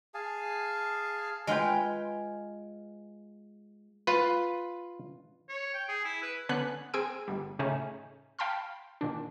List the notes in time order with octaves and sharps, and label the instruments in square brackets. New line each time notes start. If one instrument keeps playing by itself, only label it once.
[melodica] G#4 F5 G#5 A5
[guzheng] G#3 F4 B4 G5
[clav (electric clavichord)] F4 B4
[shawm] C#5
G5
G#4
E4
B4
[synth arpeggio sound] D3 B3 C#4 G#5 F#6 B6
C4 G#4 G#5 D#6 E6 D7
G1 G3
A2 C#3 A3 C#4 D#4 E4
F5 G5 A5 B5 C6 F6
A#2 D#3 D4